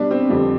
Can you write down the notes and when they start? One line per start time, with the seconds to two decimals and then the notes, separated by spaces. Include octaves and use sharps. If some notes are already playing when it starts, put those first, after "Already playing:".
Already playing: B2 G3 D4 B4
0.11 C4
0.30 F2 D3 G3